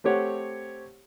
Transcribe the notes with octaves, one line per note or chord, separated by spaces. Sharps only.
A3 C4 G4 C#5 F#5